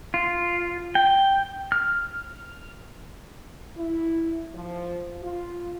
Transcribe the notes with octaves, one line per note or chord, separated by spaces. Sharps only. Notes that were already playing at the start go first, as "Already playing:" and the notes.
F4
G5
F6
E4
F3
F4